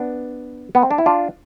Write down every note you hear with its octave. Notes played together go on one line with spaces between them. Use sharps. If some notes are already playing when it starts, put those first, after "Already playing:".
Already playing: B3 D4
B3
C4
D4
E4
D4 F4